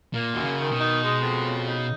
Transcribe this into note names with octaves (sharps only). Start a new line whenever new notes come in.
A#2 A#3
F#2 D#3
C#3
D#3
B2
D#4
G#3
F2
C#3
D#4